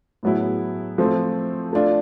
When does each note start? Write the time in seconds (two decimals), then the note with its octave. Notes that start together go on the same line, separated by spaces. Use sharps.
0.23 A2 F#3 B3 E4 G#4
0.98 F3 A3 C4
1.73 A3 D4 F4